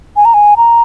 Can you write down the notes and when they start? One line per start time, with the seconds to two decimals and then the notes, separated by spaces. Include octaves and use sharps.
0.16 G#5
0.25 A#5
0.34 G#5
0.57 A#5